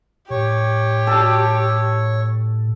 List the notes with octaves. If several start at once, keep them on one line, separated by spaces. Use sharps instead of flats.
A2 G4 C#5
A4